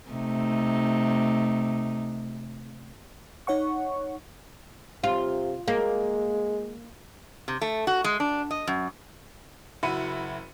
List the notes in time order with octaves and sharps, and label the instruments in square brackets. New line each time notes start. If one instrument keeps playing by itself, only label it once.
[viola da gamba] C3 A3 D#4
[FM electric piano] D#4 C#5 F#5 C#6
[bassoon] C3 [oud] F4
[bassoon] G#3 [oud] A#3
[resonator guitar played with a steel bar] C3
A3
F#4
G#3
D4
D#5
F#2
[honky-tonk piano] F#1 E4 F#4 B5 C#7 D#7